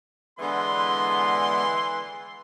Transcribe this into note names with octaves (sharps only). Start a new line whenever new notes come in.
D3 E3 G#3 B3 C6